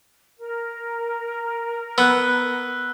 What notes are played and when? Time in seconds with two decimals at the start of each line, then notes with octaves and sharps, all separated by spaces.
0.39 A#4
1.98 B3 E6 F#6